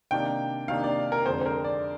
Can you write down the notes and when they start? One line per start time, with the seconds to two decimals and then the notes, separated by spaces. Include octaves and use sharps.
0.11 C3 D#3 A#3 D4 G5
0.68 C3 D#3 A#3 D4 F5
0.84 D5
1.12 A#4
1.26 F2 D3 G#3 D4 C5
1.41 C5
1.46 A#4
1.64 D5